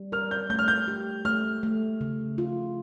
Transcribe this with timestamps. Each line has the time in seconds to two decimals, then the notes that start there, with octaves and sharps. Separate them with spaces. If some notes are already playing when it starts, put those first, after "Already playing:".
Already playing: G3
0.12 A#4 F6
0.31 G6
0.50 A3 G6
0.59 F6
0.68 G6
0.88 G4
1.25 A3 F6
1.63 A3
2.01 C#3
2.38 F4